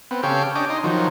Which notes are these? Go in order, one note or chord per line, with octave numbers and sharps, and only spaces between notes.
B3 C4
C#3 G4 A4 C#5 F5 G5
C#4 D4 D#5 G5 D6
D#4 D#5 C6
D#3 F3 F#3